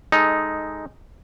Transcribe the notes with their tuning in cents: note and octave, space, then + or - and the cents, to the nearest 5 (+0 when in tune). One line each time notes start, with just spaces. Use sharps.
G#3 -10 D#4 +0 A4 -10